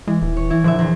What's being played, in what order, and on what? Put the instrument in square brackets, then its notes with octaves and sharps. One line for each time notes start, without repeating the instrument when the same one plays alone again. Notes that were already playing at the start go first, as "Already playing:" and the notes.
[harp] E3 [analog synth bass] G#3
[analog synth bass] D#1
[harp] C#5
E3 E4
[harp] A#1 D3 E5 [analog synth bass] F3
[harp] E2